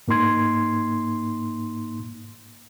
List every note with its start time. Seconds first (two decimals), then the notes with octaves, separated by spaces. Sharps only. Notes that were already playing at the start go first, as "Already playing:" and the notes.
0.08 G#2 A#3 D#4 C6 G#6